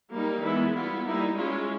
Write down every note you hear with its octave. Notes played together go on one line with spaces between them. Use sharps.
G3 A#3 D#4
E3 G#3 B3 E4
G3 B3 E4 F4
G3 A#3 D#4 E4
G#3 C#4 E4 F4